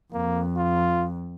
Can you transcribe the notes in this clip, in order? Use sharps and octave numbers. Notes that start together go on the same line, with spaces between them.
F2 A#3
F4